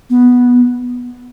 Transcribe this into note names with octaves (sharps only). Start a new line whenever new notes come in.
B3